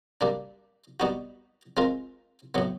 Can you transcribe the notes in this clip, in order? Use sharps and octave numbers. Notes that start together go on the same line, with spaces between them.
G3 A#3 D4
G3 B3 D#4 F#4
G#3 C4 F4 A#4
A2 F#3 B3